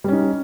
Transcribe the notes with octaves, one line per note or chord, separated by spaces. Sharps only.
G3 C#4 D#4